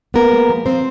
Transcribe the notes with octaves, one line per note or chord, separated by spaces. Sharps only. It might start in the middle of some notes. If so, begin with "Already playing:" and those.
A#3 B3 A#4
G#3
F3
F3 C4 C5